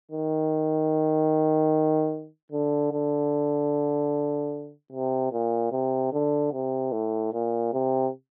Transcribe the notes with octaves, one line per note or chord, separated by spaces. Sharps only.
D#3
D3
D3
C3
A#2
C3
D3
C3
A2
A#2
C3